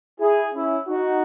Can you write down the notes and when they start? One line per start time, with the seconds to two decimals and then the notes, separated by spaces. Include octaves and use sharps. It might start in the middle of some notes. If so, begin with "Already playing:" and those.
0.20 E4 G#4
0.54 C#4 E4
0.88 D#4 F#4